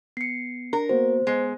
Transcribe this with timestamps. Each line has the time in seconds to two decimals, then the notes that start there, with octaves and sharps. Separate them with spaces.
0.17 B3 C7 C#7
0.73 D4 A#4
0.89 A#3 B3 F#4 C5
1.27 G#3 B3